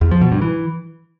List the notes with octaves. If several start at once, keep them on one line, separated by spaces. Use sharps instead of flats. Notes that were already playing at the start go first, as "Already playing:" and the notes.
E2
F3
B2
G2
E3